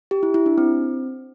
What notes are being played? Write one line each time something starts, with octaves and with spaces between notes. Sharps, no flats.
G4
E4
E4
D4
C4